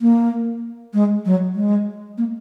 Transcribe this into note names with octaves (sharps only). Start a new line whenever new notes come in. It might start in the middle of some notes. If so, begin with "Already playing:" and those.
A#3
G#3
F#3
G#3
A#3